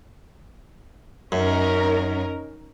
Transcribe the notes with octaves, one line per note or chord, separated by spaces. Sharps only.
F#2 C#4 D#4 A#4